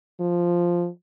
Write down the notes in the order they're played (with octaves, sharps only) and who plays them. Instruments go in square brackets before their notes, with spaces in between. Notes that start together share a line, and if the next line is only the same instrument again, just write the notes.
[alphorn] F3